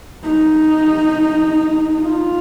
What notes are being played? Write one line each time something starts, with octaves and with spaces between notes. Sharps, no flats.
D#4
F4